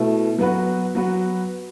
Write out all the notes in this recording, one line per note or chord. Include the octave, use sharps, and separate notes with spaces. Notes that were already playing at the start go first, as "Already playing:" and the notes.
Already playing: B2 A3 E4
F#3 B3 F#4 B4
F#3 B3 F#4 B4